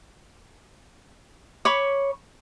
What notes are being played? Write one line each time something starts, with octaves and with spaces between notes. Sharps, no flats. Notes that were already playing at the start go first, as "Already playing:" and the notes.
C#5 B5 C#6 D6